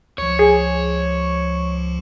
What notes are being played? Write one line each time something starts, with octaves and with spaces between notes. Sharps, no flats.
C#2 F3 C#5
G#4